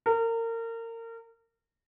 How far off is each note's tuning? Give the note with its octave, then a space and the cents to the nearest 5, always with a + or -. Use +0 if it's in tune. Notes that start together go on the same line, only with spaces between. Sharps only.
A#4 -30